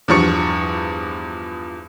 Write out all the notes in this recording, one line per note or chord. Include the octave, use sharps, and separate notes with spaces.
E2 G2 F3 C#6 C#7